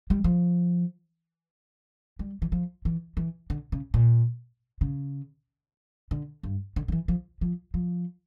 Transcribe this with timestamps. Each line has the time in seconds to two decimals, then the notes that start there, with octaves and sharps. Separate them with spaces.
0.10 G3
0.24 F3
2.19 G3
2.42 E3
2.52 F3
2.85 E3
3.17 E3
3.50 D3
3.72 C#3
3.94 A#2
4.81 C#3
6.11 D3
6.43 G2
6.76 D3
6.88 D3
6.92 E3
7.08 F3
7.41 F3
7.74 F3